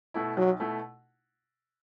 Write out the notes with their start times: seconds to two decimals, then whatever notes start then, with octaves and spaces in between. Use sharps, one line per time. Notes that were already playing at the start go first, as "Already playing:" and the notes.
0.14 B2 A3 E4
0.37 B1 F#3
0.60 B2 A3 E4